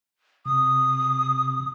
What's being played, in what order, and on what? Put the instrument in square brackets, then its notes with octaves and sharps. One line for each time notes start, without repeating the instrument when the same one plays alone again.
[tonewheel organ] C3 [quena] D#6